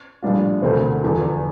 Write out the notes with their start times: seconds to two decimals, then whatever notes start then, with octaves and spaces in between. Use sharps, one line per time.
0.23 A#1 A2 G3 D4 F4
0.62 E1 D2 D3 A3 C4
1.03 F1 E2 D3 F3